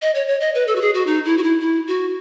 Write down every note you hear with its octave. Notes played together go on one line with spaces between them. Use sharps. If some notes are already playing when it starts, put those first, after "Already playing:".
D#5
C#5
C#5
D#5
B4
A4
F#4
G#4
F#4
D#4
E4
F#4
E4
E4
F#4